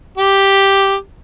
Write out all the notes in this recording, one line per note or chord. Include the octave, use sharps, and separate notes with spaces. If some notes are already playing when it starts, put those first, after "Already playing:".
G4